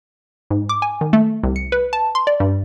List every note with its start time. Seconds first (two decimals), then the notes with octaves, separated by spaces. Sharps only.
0.51 G#2
0.69 D6
0.82 G#5
1.01 D#3
1.13 A3
1.43 C2
1.56 C#7
1.72 B4
1.93 A5
2.15 C6
2.27 D5
2.40 G2